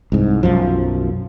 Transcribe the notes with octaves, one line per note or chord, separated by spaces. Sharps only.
C2 G#2
B1 F#2 F3